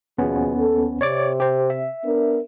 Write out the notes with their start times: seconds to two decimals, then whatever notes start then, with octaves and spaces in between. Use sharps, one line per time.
0.18 D#2 B2 F3 B3 C#4 G#4
0.58 A4
1.01 C3 C#5 D5 D6
1.40 G4 C5
1.70 E5
2.05 B3 D4 A#4